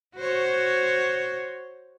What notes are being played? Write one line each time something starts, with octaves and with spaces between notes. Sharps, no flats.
F#4 C5 C#5